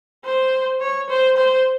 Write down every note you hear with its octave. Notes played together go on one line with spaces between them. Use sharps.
C5
C#5
C5
C5